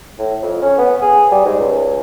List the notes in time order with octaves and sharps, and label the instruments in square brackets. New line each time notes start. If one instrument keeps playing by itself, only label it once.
[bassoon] A2
F2
C#4
B3
G#4
G3
G#2
C#2